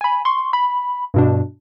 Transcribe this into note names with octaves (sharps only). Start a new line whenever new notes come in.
G#5 B5
C6 C#6
B5
G2 B2 D4